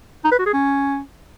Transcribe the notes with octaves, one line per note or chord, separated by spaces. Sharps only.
D#4
B4
F#4
G#4
C#4